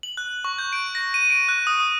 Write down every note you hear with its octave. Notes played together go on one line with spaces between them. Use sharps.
F#7
F#6
C#6
G6
D7
A#6
D#7
D7
F#6
D#6
D#6